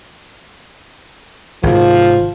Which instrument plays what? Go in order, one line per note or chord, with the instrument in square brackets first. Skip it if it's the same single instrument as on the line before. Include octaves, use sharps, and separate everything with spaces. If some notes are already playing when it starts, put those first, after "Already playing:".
[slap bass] G#1 C3 [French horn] F3